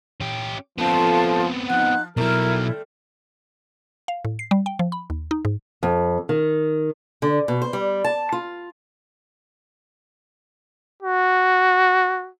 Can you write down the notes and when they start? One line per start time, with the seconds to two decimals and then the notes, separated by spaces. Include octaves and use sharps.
0.20 C#4 G4
0.78 D3 F3 A3 B3 C4 F4 A5
1.69 F3 D#4 F#5 F#6
2.17 B2 F#3 G3 A3 C4 E4 A#4
4.08 F5
4.25 A2
4.39 C7
4.51 G3
4.66 G5
4.79 F3
4.92 B5
5.10 D#2
5.31 D#4
5.45 G#2
5.83 F2
6.29 D#3
7.22 D3
7.48 B2
7.62 C5
7.73 G3
8.04 A5
8.32 F4
11.02 F#4